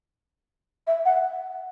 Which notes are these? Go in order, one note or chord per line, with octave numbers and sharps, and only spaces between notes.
E5
F#5